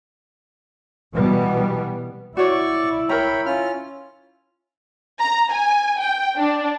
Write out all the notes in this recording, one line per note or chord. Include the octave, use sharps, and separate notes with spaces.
B2 E3 G3 B3
E4 F#4 C#5 D5 C#6
A#4 C#5 G5 A#5 B5
C#4 F4 F6
A#5
G#5
G5
D4